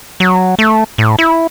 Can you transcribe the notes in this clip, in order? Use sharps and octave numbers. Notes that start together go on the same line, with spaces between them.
F#3
A3
A2
E4